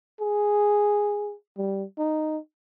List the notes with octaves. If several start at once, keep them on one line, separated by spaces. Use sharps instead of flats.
G#4
G3
D#4